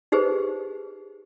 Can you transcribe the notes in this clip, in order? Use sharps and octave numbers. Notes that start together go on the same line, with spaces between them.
D#4 G4 G#4 B4 C5